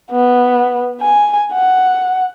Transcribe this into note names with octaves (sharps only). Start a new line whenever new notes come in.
B3
G#5
F#5